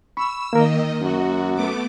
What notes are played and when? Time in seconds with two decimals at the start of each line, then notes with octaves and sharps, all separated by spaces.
0.17 B5 C#6 E6
0.53 D#3 A#3 A#4 D#5
1.02 F#2 F#4
1.55 A3 B3 D6